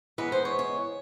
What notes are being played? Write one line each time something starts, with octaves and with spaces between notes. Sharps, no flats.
C#3 E3 G#3 B3 B4
C5
C#5
C#5